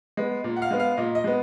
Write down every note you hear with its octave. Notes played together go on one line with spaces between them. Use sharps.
G#3 B3
A#2
F#5
F5
G#3 B3
F5
A#2 D#5
D#5
G#3 B3